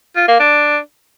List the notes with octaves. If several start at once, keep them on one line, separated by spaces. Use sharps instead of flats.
F4
A#3
D4